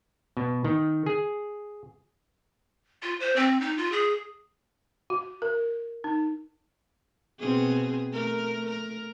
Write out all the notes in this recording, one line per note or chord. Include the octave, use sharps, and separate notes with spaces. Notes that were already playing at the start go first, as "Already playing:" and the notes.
B2
D#3
G#4
F4
C5
C4
D#4
F4
G#4
F#4
A#4
D#4
B2 C4 G#4
A3 A#4
A#4